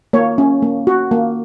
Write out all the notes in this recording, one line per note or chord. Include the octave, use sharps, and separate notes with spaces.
A#3 C#5
C#4
A#3
F#4
A#3